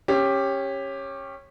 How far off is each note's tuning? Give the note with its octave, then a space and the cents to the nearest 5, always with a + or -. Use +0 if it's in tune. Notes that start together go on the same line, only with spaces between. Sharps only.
C#4 -15 G4 +10